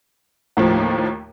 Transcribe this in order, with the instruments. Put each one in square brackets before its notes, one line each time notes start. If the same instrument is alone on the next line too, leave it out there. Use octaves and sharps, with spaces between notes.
[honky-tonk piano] D#2 A2 F3